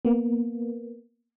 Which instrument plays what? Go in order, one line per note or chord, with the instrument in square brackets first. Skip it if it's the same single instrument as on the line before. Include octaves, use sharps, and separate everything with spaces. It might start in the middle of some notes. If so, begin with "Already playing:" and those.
[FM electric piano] A#3 B3